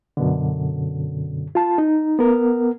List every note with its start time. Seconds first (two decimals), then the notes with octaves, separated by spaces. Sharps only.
0.17 F#2 B2 D3
1.55 F4 A5
1.78 D#4
2.19 B3 A#4